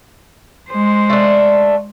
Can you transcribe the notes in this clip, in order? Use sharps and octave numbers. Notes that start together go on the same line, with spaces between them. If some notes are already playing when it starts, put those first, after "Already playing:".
G#3 C5
A3 D4